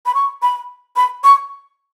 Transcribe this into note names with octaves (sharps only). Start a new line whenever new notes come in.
B5
C#6
B5
B5
C#6